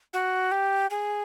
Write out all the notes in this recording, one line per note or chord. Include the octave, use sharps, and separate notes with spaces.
F#4
G4
G#4